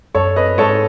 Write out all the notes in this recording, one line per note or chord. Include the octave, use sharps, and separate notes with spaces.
F#2 A4 C#5
B4 D#5
G#2 A4 C#5